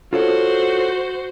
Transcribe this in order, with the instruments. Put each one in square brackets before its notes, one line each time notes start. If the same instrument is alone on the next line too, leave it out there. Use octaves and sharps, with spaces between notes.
[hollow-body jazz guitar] F4 A4 C#5 [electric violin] F#4 C5